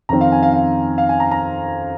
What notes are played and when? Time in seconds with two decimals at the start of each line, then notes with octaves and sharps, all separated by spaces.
0.09 F2 D#3 C4 A#5
0.21 F5
0.32 G#5
0.43 F5
0.53 F5
0.98 F5
1.09 G#5
1.20 A#5
1.31 A#5